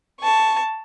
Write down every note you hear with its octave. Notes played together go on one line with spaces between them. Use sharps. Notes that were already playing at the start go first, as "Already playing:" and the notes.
A5 C#6